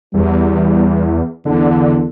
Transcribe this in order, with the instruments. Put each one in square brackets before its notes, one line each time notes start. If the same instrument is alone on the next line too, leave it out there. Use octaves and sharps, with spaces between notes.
[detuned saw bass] E2 [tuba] G3
[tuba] E2 [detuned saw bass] D3